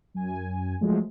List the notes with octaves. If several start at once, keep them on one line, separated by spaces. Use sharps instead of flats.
F#2 G#5
F3 F#3 G#3 A3